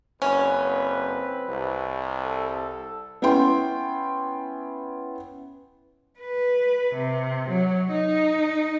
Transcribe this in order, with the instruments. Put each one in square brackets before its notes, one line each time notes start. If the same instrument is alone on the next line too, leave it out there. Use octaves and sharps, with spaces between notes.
[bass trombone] F#1 [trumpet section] C4 B4 [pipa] C#4
[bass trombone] C2
[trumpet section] A4
[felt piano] B3 C#4 E4 G5 C6
[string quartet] B4
C3
F#3
D#4